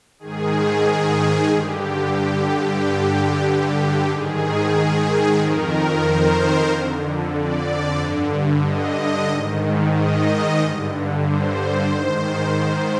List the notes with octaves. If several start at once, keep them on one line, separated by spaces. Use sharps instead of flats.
G#2 D#3 G#4
G2 D3 G4
G4
G2 D3 G4
G4
G#2 D#3 G#4
F2 D#3 A#4
C5
F2 D3
D5
G2 D3
D#5
G#2 D#3
D#5
G2 D3
C5
G#2 D#3